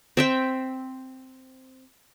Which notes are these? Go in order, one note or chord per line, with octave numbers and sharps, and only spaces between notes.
C4 E5 G5